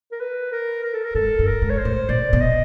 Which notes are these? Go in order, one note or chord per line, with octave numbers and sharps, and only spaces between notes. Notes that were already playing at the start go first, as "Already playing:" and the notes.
A#4
B4
A#4
A#4
A4
A#4
G#2 A4
G2
A#4
G#2
C#5
C5
A2
A#2 D5
B2
D#5